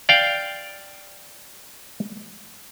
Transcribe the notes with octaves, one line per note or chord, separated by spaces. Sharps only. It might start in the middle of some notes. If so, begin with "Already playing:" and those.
D5 F5 G5